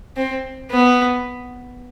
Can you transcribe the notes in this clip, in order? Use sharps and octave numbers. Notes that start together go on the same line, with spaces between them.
C4
B3